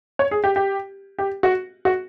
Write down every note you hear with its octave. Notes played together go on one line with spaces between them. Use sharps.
C#5
G#4
G4
G4
G4
F#4
F#4